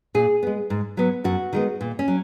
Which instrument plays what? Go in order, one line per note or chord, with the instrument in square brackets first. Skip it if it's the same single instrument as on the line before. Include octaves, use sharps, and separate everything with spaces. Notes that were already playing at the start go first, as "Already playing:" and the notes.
[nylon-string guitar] A#2 G#4
G#3 B3
G#2
F#3 B3
F#2 F#4
D#3 G#3 B3
A#2
C#4
F#3